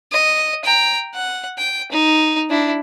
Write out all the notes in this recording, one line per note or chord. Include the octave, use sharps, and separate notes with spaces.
D#5
G5 A#5
F#5
G5
D#4
D4 E4